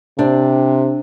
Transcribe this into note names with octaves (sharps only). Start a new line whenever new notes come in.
C3 C4 D4